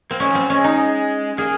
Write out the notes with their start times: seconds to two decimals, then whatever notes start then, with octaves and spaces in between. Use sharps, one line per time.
0.11 A#3 C4
0.20 G#3 C#4
0.26 D#3
0.30 F3 C4
0.40 F#3
0.50 G#3 C#4
0.64 D#4
1.38 A#3 G#4